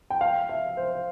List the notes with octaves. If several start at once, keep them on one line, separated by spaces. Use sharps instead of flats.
G5
F5
E5
C5